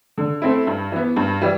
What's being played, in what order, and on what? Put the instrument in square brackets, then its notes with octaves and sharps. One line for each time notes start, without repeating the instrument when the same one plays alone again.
[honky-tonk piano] D3
A3 C4 E4
G2
E3 B3
G2
E3 G3